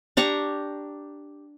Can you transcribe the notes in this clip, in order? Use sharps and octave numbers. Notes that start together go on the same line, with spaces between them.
D4 G4 A#5 C#6